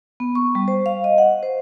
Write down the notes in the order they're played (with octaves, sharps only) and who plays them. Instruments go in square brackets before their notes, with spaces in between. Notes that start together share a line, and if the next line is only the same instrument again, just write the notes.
[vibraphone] B3
C#6
G3
C5
F5
D#5
F#5
C5